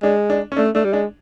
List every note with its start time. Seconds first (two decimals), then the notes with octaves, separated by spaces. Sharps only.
0.02 G#3 D4
0.30 D4
0.52 C#4
0.57 A3 D4
0.75 A3 D4
0.84 G3
0.93 G#3 D4